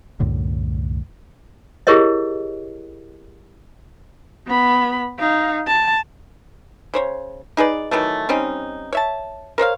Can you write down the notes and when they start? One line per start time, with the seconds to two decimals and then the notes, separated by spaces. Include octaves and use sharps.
0.20 C2 F#2 A2 D3
1.87 E4 G4 G#4 A#4 C#5 D#5
4.47 B3 B5
5.19 D#4 F5
5.67 A5
6.94 C#3 C5 C#5
7.57 D#4 G#4 B4 D5
7.91 D#3 E3 F#3 A3
8.29 G3 C4 C#4 D#4
8.93 C#5 E5 A5
9.58 A#4 C5 C#5 F5